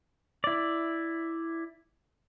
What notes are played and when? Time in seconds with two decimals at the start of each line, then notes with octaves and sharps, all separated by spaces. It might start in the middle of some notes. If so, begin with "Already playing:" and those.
0.44 E4 D5